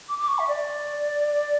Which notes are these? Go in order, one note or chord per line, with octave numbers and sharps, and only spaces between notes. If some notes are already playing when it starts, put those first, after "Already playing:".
D6
D6
C#6
E5
D5